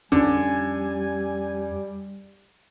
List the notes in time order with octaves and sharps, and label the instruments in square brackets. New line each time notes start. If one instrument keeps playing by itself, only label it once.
[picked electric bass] F2 C#4 [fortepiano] D3 [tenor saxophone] G3 [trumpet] G#5